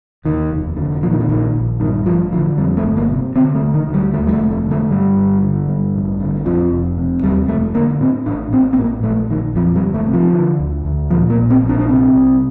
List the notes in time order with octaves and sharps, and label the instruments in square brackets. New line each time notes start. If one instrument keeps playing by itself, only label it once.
[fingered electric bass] D#2 D#3
F1
D3
A#2 F3
D#3
D3
A#1 D#3
A#1
G2 D#3
A1 F3
D3 F3
F2 G3
A3
G1
A#3
C3
D3 C4
A3
D2
D#3
D2
G3
D#2 A3
G3
A3
F1
A3
D3
A3
G2 G3
G1
D3
G2
A1
D3
F2 F3
F1
C3
D#2 G3
F1 A3
D3 A#3
A2 C4
A1 D4
A1 C4
C4
A2 A#3
A#1 A3
A#1 D#3
F2 F3
G3
G1
A3
C3
F3
D3
D2
D2
A#2 F3
A#3
A#1
C4
A#1
D4
D4
C3 C4
C2